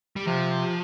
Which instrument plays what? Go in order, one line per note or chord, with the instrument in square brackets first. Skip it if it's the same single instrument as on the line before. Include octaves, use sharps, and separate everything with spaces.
[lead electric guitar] G3
[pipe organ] C3 [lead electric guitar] F3